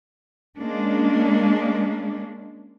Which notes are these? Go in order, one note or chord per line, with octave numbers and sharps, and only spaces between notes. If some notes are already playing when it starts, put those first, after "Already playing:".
G#3 A#3 C#4 D4